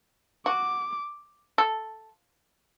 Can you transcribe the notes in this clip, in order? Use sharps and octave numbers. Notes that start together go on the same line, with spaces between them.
F#4 D6
A4